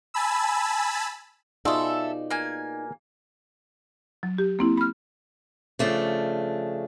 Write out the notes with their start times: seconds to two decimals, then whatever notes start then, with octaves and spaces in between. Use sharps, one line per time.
0.14 G#5 A5 B5 E6
1.65 B2 D#4 F4 G#4 A4 D5 E5
2.30 A#3 G#5
4.23 F#3
4.38 G4
4.59 A#3 C4 E4
4.77 B5 F6
5.79 C#3 F3 A3 D4